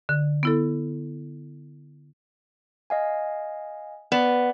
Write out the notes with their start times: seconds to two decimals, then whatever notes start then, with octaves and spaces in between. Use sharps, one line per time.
0.09 D3
0.43 B3 E4 A4
2.90 D#5 F5 G#5
4.12 B3 D5